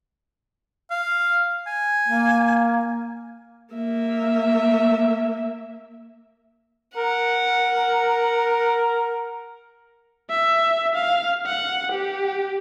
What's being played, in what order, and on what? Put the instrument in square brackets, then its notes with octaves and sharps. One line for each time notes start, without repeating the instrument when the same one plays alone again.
[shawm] F5
G#5
[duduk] A#3
[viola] A#3 E5
[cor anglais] A#4 [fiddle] F#5
[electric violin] E5
F5
F#5
G4